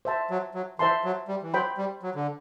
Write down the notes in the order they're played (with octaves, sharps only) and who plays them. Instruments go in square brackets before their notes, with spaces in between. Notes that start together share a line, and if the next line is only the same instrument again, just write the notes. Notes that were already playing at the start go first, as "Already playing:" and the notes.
[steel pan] C5 E5 A5 C6
[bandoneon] F#3
F#3
[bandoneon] E3 [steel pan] C5 E5 A5 C6
[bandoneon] F#3
G3
E3
[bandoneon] F#3 [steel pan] C5 G5 B5
[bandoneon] G3
F#3
D3